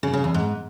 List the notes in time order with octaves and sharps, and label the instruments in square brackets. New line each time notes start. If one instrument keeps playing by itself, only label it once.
[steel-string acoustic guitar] C#3
C#3
E2
G#2